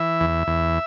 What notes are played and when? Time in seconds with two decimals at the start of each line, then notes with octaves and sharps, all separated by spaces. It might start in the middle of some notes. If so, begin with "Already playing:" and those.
Already playing: E3 E5
0.20 E2
0.47 E2